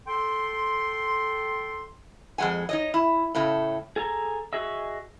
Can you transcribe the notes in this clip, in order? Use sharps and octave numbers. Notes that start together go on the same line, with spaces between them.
A4 G5 C6
F2 G#3 A3 F#5 G#5
D#4 C#5 D#5
E4
A2 C#3 A3
G#4 A4 G#5 A#5
F#4 G#4 D#5 E5